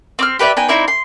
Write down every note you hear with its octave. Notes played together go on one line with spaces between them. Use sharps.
C4 D6 F6
G4 B4 D5 E5
B3 D#4 G5 G#5
C4 D#4 E4 D5
C6